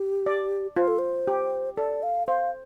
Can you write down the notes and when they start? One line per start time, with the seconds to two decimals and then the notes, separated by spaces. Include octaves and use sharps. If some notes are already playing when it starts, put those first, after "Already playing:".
Already playing: G4
0.26 D5
0.76 F4 C5
0.88 A4
0.98 C5
1.27 G4
1.77 A4 D5
2.03 F5
2.27 C5 F5